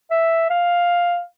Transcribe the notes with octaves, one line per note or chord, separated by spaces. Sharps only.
E5
F5